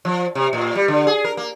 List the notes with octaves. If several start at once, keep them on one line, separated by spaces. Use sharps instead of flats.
F3
C3
A2
G3
D3
G#4
A#4
A#3